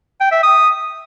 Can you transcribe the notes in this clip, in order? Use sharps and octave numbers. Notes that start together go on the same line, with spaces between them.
G5
E5
D#6